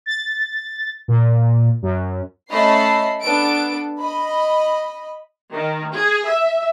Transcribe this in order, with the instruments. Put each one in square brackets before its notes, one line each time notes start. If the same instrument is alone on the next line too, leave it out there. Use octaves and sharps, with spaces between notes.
[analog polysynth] A6
A#2
F#2
[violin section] A3 C#4 A4 D#5 B5 C7
B3 D4 A4 D7
D#5 B5
[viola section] D#3
G#4
E5